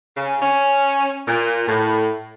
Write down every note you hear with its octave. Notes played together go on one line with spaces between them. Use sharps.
C#3
C#4
A#2
A2